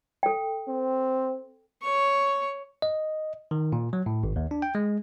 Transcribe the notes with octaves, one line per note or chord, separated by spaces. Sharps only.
A4 G5
C4
C#5 C#6
D#5
D#3
A#2
F#3
A2
G#1
D#2
D4
G5
G#3